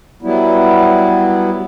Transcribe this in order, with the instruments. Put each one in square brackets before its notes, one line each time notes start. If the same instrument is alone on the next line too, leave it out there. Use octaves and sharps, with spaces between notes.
[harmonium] F#3 G3 B3 E4